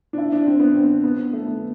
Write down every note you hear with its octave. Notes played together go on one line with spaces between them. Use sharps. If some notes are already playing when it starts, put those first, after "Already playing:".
D4
E4
D4
C4
B3
C4
B3
A3
B3